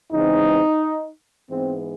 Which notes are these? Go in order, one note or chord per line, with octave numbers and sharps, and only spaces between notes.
E2 C#3 E3 G#3 C4 D#4
G#2 E3 G#3 B3 C4